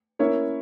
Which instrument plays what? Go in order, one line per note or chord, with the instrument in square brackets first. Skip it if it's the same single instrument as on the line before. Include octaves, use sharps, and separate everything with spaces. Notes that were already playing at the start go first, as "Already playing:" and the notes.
[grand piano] A#3 C#4 E4 A#4 C#5